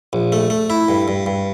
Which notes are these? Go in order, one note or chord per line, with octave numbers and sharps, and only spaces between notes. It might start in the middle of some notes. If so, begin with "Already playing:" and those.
A#1
A3
A3
E4
G2
G2
G2